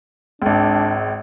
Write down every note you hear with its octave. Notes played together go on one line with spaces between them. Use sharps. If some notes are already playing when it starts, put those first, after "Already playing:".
G#1 C#2 D4